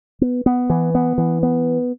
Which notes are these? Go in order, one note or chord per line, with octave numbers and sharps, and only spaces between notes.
B3
B3
E3
B3
E3
B3